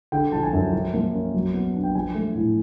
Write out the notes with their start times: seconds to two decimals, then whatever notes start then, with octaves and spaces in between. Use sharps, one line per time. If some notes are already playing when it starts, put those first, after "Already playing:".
0.12 D3 G5
0.32 F3 A5
0.43 G#5
0.53 F#2
0.73 F3
0.94 A#3
1.13 C#4
1.34 F#3
1.54 B3
1.74 D4
1.84 G5
1.95 F3 G#5
2.15 A3
2.35 A2